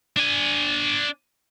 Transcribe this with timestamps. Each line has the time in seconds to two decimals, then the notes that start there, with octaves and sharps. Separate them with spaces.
0.17 D4 G#5